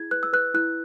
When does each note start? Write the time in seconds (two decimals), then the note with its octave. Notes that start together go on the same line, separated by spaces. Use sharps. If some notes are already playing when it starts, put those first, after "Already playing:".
Already playing: E4 G#4 G#6
0.11 B4 F#6
0.23 E6
0.33 B4 F#6
0.54 E4 F#6